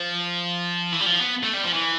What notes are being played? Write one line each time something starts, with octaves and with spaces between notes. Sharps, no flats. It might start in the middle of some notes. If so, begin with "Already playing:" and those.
Already playing: F3
E3
G3
F3
B3
A3
G3
F3
E3